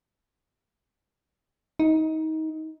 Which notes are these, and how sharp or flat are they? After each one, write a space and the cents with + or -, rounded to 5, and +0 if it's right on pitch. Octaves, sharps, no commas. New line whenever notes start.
D#4 +25